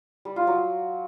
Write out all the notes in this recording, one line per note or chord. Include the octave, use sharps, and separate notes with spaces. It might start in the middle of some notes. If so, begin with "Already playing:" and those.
G3
F4
F#3